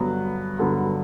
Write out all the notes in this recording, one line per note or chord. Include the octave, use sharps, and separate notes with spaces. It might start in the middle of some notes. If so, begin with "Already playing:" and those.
Already playing: G2 D3 F#3 B3
G2 D3 F#3 B3